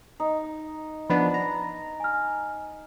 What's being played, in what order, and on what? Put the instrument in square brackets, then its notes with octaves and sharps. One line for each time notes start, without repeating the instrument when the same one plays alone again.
[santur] D#4
[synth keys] F3 B3 D4 [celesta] B5
[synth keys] A#5
[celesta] G#5 F6